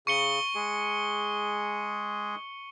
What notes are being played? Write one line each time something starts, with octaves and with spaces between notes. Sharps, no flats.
C#3 C#6 C#7 G7
G#3 G#4